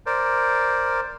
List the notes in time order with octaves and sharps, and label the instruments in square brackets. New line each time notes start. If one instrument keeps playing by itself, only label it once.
[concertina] A#4 C5 D5